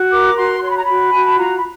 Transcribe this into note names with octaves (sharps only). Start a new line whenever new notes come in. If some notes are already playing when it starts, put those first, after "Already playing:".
Already playing: F#4
A#4 D6
F#4 C6
C#5 C6
B5
A#5
F#4 B5
F#4 G#5
A5
F4 A#5
B5